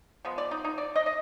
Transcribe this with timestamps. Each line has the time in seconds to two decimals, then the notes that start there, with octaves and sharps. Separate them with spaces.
0.25 F3 G#3 B3
0.38 D5
0.51 D#4
0.64 D#4
0.78 D5
0.96 D#5
1.06 D#5